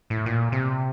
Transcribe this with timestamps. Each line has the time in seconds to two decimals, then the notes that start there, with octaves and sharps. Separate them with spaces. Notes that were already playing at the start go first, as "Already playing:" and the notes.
0.10 A2
0.26 A#2
0.52 C3